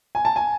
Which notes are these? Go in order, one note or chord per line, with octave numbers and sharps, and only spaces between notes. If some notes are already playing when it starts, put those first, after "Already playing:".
G#5
A5
G#5